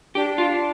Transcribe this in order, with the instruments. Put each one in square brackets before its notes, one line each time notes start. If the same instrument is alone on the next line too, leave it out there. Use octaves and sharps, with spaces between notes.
[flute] D4 [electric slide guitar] G4
[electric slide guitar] F4